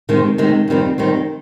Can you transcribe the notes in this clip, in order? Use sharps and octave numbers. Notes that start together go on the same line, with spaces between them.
C3 D#3 G#3
C3 D#3 G#3
F2 D#3 G3 C4
F2 D#3 G3 C4